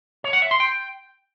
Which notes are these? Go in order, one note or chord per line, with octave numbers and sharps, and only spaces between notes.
C#5
F#5
E5
C6
G5